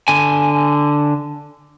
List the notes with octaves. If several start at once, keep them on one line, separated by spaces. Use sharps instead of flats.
D3 G#5